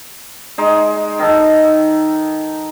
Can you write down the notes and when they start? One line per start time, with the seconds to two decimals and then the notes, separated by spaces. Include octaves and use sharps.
0.58 G#3 D#4
1.19 D#3 A4